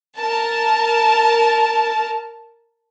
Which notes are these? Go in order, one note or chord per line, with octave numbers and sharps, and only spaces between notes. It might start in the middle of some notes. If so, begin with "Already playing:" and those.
A#4 A5